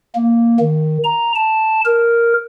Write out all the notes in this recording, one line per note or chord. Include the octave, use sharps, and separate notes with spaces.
A#3
D#3
A#5
A5
A#4